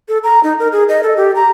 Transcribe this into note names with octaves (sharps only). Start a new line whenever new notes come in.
A4
A#5
D#4
A#4
G#4
D#5
A4
G4
A#5